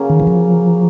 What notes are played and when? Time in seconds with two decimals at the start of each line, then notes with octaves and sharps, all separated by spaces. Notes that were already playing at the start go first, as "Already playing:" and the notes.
Already playing: C#3 F#3 A#3 C#4
0.10 D#3
0.20 E3
0.27 F3